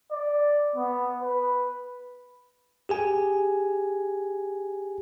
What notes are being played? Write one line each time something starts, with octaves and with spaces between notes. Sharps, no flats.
D5
B3
B4
G4 G#4 G#5